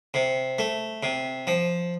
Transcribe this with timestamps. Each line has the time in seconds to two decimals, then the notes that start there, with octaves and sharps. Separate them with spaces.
0.14 C3
0.59 A3
1.03 C3
1.47 F3